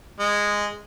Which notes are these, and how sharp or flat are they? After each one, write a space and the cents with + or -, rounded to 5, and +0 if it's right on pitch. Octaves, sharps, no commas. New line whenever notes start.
G#3 -10